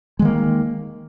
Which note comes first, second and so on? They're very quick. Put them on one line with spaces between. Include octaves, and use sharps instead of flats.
G#3 D#3 A#3